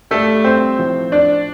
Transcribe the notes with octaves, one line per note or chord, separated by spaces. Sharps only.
G2 G3 A3 A4
C4 C5
A2 F3 A3
D4 D5